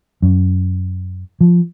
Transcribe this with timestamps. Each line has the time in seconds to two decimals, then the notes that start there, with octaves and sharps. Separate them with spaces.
0.22 F#2
1.41 F3